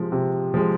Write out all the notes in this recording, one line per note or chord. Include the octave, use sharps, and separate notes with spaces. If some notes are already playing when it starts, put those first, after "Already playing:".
Already playing: C3 F3 G#3
C3
F3 G#3